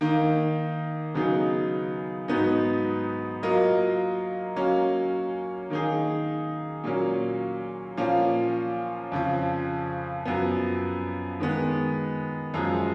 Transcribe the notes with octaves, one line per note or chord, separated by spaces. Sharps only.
D#3 A#3 D#4
C#3 F#3 B3 D#4 G#4
G#2 F#3 B3 D#4
F#3 A#3 F4 A#4 D#5
F#3 A#3 C#4
D#3 A#3 D#4 G#4
A#2 F#3 A#3 C#4
A#2 F3 A#3 C#4
F2 C#3 F3
F#2 F3 B3
D#3 G#3 B3
F#2 F3 G#3